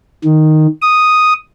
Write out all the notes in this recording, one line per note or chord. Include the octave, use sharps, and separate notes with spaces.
D#3
D#6